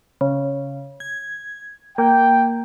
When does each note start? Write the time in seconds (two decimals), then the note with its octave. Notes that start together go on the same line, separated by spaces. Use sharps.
0.21 C#3
1.00 G#6
1.98 A#3 G5